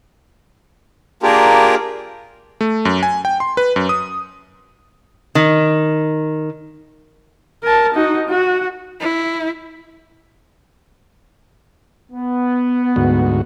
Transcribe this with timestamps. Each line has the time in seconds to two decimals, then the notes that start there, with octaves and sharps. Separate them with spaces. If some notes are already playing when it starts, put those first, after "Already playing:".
1.23 A#3 D4 F4 G4 G#4 A#4
2.61 A3
2.85 F#2
3.03 G#5
3.25 G5
3.40 C6
3.57 B4
3.76 F#2
3.89 D#6
5.35 D#3
7.63 A#4 A5
7.95 D#4 F#4
8.28 F#4
9.00 E4
12.12 B3
12.96 D2 G#2 F#4